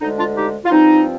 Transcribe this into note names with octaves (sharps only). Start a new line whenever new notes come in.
D2 D3 G#3 D#4
D4 F4
D#4 G4
F4
G2 F3 C4 D#4